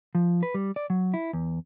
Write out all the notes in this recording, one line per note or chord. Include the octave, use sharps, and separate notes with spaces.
F3
B4
G3
D5
F#3
E4
E2